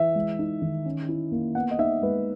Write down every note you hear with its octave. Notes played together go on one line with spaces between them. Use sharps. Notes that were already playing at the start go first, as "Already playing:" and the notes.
Already playing: E3 E5
G#3
D#4
D#3
C#4
E4
A#3
B3 F#5
D#5
D#4 E5
G#3 B4